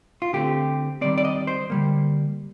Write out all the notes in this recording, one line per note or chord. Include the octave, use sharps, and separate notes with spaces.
F4
D3 A3 C4 G4
D#3 G3 C4 D5
D5
D#5
C5
D3 G3 A#3